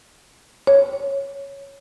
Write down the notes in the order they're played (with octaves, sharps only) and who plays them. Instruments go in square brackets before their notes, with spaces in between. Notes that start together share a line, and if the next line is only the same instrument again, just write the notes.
[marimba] C#5